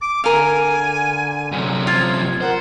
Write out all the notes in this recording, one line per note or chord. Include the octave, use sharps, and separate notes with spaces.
D6
D3 A#4 F5 G#5
F#2 C3
F3 F4 G#6
A#4 C5 F#5